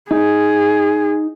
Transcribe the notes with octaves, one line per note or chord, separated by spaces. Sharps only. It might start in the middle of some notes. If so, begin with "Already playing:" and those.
D#4 G#4